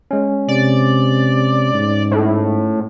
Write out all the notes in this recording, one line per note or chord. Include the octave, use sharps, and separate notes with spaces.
G#3 C#4
C3 D5
G#2
A2